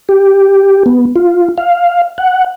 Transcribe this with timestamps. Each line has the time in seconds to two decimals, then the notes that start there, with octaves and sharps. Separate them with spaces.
0.09 G4
0.86 B3
1.16 F4
1.58 F5
2.18 F#5